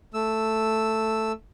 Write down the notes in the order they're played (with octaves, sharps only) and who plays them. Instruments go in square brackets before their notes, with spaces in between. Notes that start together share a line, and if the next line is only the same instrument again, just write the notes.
[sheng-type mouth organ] A3 E6